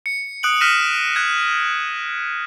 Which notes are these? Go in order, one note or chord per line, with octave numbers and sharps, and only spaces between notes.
C#7
D#6 F#6 D7 F#7
F6 F#6 A#6 B6 D#7 E7
F#6 G#6